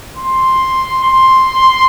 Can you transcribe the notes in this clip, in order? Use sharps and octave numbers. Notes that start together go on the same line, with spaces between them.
C6
C6